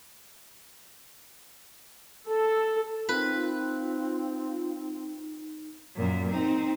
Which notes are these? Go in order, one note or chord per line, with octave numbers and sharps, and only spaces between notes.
A4
C4 D#4 F4 B4
F#2 A#2
C4 D#4